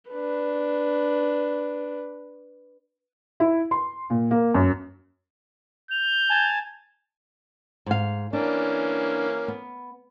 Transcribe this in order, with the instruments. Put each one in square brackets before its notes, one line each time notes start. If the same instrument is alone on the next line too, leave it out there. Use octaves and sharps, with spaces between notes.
[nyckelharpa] D4 B4
[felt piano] E4
C6
A#2
A#3
F#2
[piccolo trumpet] G6 [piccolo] F7
[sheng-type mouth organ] G#5 A5
[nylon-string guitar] G#2 F5
[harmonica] E3 A#3 C#4 [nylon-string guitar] D4
[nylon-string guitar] B3